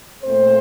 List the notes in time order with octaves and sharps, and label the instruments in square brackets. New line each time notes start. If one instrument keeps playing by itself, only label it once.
[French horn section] A#2 A3 C4 C5